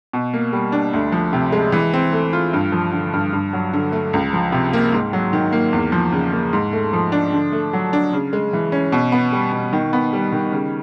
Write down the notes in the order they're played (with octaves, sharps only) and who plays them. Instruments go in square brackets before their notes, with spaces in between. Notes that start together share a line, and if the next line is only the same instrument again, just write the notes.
[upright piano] B2
A#3
G3
D4
D2
F3
C3
G#3
E3
C4
A3
F4
G2
F3
D3
G2
G2
F#3
D3
A3
C#2
F3
C3
A#3
G#2
F#3
D#3
A#3
E2
F3
C#3
A#3
G#2
A3
F3
D4
D3
A3
F#3
D4
C#3
G#3
E3
C#4
B2
B3
G3
B2
D#3
B3
G3
D#3
C#3